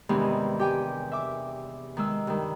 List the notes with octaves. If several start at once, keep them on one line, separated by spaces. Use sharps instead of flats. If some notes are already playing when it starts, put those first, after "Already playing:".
E2 G2 C3 D#3 E3 G#3
G4 G5 G#5
E5 D6
D#3 G#3 E6
G2 D#3